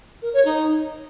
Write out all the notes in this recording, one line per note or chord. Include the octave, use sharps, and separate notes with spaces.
A#4
C#5
D#4